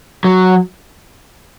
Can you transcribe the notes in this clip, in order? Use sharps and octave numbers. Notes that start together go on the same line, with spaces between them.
F#3